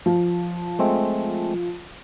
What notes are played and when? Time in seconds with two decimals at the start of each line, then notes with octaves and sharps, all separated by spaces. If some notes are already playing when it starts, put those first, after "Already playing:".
0.06 F3
0.79 G#3 A3 C4